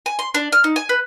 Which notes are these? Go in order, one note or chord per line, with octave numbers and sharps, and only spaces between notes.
G#5
C6
D4
F6
D#4
G#5
B4